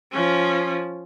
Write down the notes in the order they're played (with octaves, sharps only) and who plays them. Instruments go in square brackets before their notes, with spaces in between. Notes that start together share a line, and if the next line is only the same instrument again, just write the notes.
[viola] F3 C#4